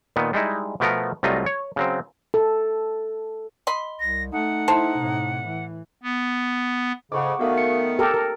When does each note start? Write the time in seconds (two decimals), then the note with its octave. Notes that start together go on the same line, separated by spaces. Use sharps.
0.16 A#2 D#3 B3
0.33 G3 G#3 D#4 E4
0.80 B2 F3 A3 B3 A#4
1.23 C2 F#3 G3 A3 F4 D#5
1.46 C#5
1.76 C#3 F#3 C4
2.34 A4
3.67 D#5 B5 C6
4.00 C2 A#6
4.33 A3 D#4 F#5
4.68 E4 A4 C5
4.98 A2 C3
5.47 E3
6.03 B3
7.12 F2 G#2 C#3 F#5 C#6 D6
7.39 D#3 A3 B3 F#4 F5
7.58 C#7
7.99 G4 A4 A#4
8.14 A#4